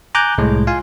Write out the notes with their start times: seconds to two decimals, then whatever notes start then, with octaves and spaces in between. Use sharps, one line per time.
0.15 G#5 A#5 D6 F#6 G6
0.38 C2 A2 G#3
0.67 F4 F5 G#5